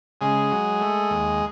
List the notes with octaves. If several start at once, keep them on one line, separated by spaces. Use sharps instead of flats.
C#3 G#3 G#4
F#3
A3
D#2